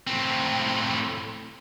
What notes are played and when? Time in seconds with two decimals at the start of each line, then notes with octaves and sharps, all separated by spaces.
0.07 A2 C4